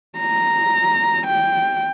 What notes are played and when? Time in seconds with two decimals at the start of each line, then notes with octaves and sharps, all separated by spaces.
0.18 A#5
1.27 G5